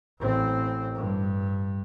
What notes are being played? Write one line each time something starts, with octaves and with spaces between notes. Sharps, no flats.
A1 C4
G2